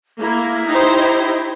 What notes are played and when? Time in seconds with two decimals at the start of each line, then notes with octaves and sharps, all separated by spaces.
0.21 A#3 E4
0.67 D#4 G4 C5